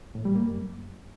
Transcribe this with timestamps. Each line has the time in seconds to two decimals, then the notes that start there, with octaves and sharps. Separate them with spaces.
0.15 A2
0.25 G3
0.36 A#3
0.46 F#2